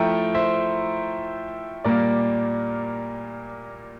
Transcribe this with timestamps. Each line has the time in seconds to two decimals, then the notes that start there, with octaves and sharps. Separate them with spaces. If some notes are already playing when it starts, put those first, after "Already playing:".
Already playing: F3 A3 E4 G5 A#5
0.35 C5 E5
1.84 A#2 G3 A#3 A#4 D5